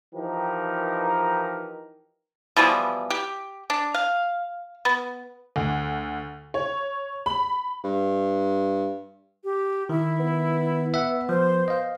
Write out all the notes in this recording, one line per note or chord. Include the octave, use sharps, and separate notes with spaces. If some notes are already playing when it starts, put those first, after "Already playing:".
E3 F3 D#4 G4 A#4
B2 E3 F3 G3
G4
D4
F5
B3
D2
C#5
B5
G2
G4
D#3 E4
B3
E5 F#5
F3 C5
D#5 F5